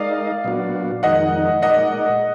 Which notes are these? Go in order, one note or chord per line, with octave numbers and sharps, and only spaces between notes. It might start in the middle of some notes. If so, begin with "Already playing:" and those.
Already playing: G#3 D#4 A#4 D5 D#5 F5
A#2 F#3 B3 D4 F#4
F2 D#3 G#3 D#4 A#4 D#5 F#5
A#2 G#3 D#4 A#4 D5 D#5 F#5